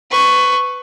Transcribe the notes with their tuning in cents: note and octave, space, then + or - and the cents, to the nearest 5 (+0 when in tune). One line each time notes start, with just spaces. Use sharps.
B4 +20 C#6 +0